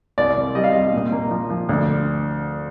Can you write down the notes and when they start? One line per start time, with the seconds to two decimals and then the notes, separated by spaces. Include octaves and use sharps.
0.18 C2 D5
0.37 C2
0.55 G3 D#5
0.64 F5
0.72 C3 D#5
0.93 A#2
1.12 A#3
1.31 F3
1.50 F3
1.69 D2